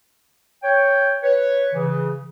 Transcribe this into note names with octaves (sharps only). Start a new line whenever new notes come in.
C#5 G5
B4 C#5
C#3 E3